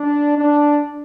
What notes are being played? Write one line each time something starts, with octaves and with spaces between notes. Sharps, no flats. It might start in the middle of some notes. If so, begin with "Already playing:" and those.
Already playing: D4
D4